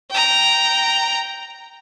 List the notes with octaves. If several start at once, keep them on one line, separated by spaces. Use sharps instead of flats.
G5 A#5